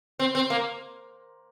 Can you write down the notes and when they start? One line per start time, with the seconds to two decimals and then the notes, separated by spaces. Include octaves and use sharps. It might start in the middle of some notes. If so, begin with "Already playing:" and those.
0.19 C4
0.35 C4
0.50 A#3